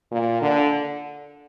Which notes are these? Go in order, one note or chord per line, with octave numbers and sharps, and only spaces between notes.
A#2
D3